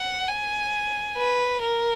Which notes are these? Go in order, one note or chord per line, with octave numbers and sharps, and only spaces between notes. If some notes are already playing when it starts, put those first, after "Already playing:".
Already playing: F#5
G#5
B4
A#4